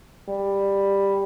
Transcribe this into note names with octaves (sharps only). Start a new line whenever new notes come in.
G3